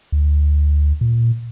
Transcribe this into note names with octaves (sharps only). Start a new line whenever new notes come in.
D2
A#2